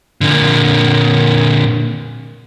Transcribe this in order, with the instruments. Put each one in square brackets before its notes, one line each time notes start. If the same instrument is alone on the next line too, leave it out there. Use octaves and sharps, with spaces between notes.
[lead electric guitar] A#2 D3